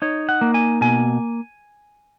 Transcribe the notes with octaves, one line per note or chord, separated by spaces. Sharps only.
D#4 C#5
F#5
A#3
G#5
B2 G#5